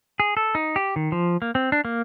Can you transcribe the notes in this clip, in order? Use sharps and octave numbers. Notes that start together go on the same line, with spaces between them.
G#4
A4
D#4
G4
D#3
F3
A#3
C4
D4
A#3